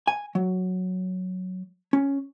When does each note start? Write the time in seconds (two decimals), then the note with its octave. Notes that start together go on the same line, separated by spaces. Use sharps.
0.07 G#5
0.35 F#3
1.93 C#4